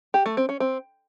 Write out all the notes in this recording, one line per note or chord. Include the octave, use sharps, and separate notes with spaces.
G4
A3
C4
C#4
C4